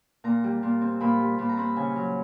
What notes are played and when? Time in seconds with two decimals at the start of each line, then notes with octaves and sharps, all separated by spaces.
0.24 A#2 A#5
0.44 G3
0.63 A#2
0.81 C4
1.00 A#2 B5
1.20 G3
1.38 A#2 B5
1.49 A#5
1.57 C4 B5
1.76 C#3 G#5
1.96 F#3